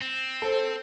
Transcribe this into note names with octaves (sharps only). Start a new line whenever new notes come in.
C4
A4 C5